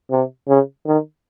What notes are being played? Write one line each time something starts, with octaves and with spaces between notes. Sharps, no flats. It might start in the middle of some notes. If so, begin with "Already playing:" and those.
C3
C#3
D#3